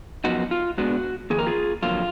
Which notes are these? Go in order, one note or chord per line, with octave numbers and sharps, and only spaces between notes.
F#2 F3 B3 D#4 F#4
F4
A#2 G#3 B3 D4 F#4
F2 D#3 A#3 G#4
A#4
F4 G#4
F2 D3 F#3 A#3 F4